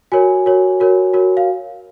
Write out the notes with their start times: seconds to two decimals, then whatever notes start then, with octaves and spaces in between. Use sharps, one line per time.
0.12 F#4 A#4 C#5 G#5
0.46 F#4 A#4 C#5
0.80 F#4 A#4 C#5
1.13 F#4 A#4 C#5
1.37 F5